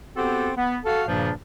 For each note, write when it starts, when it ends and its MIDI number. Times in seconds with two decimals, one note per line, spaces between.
0.16 0.49 59
0.16 0.49 60
0.16 0.49 66
0.16 0.49 67
0.16 0.49 69
0.57 0.77 59
0.84 1.03 66
0.84 1.03 69
0.84 1.03 77
1.07 1.31 43
1.07 1.31 46
1.07 1.31 49
1.07 1.31 53
1.07 1.31 58
1.07 1.31 62